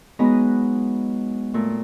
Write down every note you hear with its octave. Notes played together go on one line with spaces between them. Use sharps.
F#3 G#3 B3 D#4 B4 D#5
A#2 A3